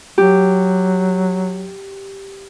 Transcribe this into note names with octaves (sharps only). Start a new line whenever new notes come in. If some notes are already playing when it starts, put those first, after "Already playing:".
F#3 G4